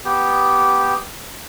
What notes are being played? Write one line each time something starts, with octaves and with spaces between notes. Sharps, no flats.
B3 G4